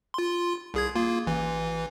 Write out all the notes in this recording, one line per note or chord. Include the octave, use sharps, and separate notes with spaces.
F4 C6
C2 G#4 G#6
A#3 F4
A1 E3